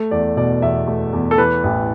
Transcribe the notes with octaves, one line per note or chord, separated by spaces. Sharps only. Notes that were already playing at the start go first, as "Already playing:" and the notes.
Already playing: A3
E2 D5
B2 D5
E2 E5
A3
E2
A4
E3 B4
A1